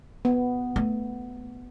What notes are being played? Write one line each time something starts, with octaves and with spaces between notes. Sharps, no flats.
B3
A3